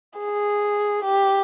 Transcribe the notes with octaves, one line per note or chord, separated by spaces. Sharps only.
G#4
G4